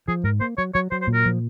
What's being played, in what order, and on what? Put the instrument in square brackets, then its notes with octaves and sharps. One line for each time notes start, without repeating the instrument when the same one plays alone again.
[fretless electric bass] F3 [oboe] G#4
[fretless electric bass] G#2 [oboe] A#4
[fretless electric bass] A#3 [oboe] C5
[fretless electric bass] F#3 [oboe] C#5
[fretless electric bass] F#3 [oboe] C#5
[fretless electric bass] F#3 [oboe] C5
[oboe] C5
[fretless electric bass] A#2
[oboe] A#4
[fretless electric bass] F3